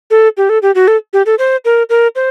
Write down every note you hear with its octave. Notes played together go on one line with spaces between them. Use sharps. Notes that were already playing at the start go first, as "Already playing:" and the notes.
A4
G4
A4
G4
F#4
A4
G4
A4
C5
A#4
A#4
C5